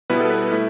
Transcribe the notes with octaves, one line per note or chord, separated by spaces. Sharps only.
B2 G3 B3 E4 B4
A4
B4
A3 E4